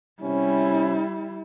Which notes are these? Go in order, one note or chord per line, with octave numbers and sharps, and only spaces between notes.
C3 G3 C#4 E4